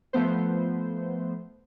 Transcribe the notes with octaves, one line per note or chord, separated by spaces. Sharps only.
F3 A3 B3 C5